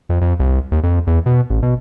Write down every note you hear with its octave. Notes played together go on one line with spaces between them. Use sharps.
F2
F2
C2
D#2
F2
E2
B2
A1
B2